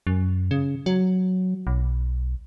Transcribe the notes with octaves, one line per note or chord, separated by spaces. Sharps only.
F#2
C#3
F#3
B1